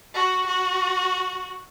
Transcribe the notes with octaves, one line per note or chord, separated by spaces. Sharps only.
F#4
F#4